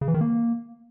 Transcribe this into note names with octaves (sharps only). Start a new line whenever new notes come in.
C#3
E3
D#3
A#3